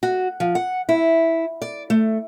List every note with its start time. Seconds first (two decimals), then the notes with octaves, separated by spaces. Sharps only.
0.03 F#4
0.40 F3
0.55 F#5
0.89 E4
1.62 D5
1.90 A3